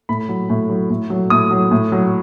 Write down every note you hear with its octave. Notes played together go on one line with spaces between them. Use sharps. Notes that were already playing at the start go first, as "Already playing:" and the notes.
A2 B5
F#3
A2
F#3
A2
F#3
A2 D#6
F#3
A2
F#3